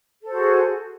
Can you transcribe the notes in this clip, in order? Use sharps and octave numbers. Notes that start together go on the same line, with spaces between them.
F#4 G#4 A4 C5